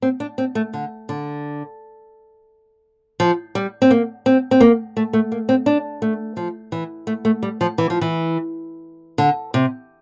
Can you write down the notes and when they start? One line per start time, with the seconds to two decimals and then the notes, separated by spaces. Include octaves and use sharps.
0.02 C4
0.20 D4
0.38 C4
0.55 A3
0.73 D3
1.09 D3
3.20 F3
3.55 G3
3.82 C4
3.91 A#3
4.26 C4
4.51 C4
4.60 A#3
4.97 A3
5.13 A3
5.32 A#3
5.49 C4
5.66 D4
6.02 A3
6.37 F3
6.72 E3
7.07 A3
7.25 A3
7.43 G3
7.61 F3
7.78 E3
7.90 F3
8.01 E3
9.18 D3
9.54 C3